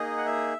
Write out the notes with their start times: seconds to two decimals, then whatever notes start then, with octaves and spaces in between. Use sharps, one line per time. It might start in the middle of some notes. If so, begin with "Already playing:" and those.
Already playing: A#3 D#4 G#4 D#5
0.18 F#5
0.26 E5